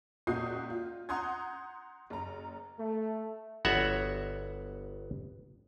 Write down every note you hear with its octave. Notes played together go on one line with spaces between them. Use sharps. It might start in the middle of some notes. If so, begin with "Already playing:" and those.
C#2 A#2 F#4 D#6 G6 C7
F4
F#5 A#5 C6 D#6 G6 G#6
F#1 A#5
A3
G1 B3 F#4 C#5 E5 F#5